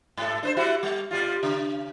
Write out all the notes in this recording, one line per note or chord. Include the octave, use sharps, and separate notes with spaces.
G#2 A4
D4 B4 C5
G3 E4 F#4
G3
A#2 G3 F4
C#3